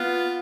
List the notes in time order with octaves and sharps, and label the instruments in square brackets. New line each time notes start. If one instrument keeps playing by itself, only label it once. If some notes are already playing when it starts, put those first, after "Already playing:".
Already playing: [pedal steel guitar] B3 [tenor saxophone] F4